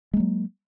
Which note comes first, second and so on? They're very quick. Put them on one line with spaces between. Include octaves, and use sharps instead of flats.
G#3 A#3 F#3